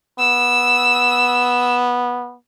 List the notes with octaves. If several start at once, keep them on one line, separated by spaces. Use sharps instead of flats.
B3 E6